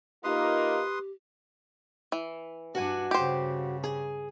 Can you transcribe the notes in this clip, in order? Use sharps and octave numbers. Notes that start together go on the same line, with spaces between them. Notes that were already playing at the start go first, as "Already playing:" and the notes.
A#3 D#4 F4 G4 B4 C6 D#6
E3
G2 D4 F#4 F#5 G#5
G2 C#3 G4 C5
G#4